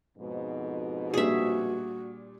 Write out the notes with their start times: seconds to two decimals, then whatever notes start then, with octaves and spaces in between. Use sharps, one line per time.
0.18 F2 G#2 B2
1.14 A#2 G3 D4 F#4 G#4 E5